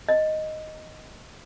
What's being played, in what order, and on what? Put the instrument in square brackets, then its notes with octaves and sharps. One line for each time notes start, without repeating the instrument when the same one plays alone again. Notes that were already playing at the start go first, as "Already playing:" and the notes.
[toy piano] D#5